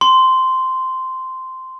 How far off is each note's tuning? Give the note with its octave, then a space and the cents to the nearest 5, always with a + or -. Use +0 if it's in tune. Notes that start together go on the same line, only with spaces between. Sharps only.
C6 -10